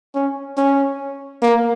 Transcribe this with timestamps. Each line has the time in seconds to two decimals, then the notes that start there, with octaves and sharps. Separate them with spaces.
0.15 C#4
0.57 C#4
1.42 A#3